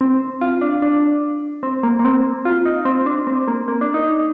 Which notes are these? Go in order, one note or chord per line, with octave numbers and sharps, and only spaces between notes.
C4
F4
D4
D4
C4
A#3
A#3
C4
F4
D#4
C4
D4
C4
A#3
A#3
D4
D#4